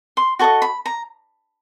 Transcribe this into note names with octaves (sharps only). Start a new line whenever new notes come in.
C6
F#4 A4 D#5 C#6
B5
A#5